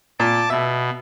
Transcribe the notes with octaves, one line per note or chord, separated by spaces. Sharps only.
A#2 A5 D6
B2 E5